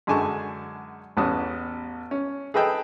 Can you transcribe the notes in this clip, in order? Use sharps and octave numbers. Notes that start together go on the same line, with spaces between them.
F#2 D3 G#3 G#5 A5 C#6
A1 E2 B3 C#4 A5 D#6
C#4
G#4 A4 B4 D#5 G5 A5